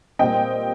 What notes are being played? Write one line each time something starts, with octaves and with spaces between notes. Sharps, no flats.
A#2 G3 C4 D#5 G5